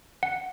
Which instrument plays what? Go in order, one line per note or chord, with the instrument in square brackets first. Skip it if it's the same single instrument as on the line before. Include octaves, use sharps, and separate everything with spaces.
[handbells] F#5